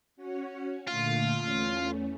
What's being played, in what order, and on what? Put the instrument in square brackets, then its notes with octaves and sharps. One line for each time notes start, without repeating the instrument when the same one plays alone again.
[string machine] C#4 F#4 C#5
[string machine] A#2 D3 A3 [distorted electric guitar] F4
[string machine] E2 A3 C#4